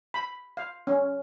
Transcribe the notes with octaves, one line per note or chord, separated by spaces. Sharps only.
B5
F5
C#4